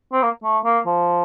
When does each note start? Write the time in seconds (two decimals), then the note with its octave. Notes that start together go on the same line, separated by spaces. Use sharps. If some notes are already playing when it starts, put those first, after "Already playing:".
0.12 C4
0.22 A#3
0.43 A3
0.64 A#3
0.86 F3